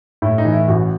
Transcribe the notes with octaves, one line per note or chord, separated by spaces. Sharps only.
A2 E4
D#4
E3
E4
A1 F#4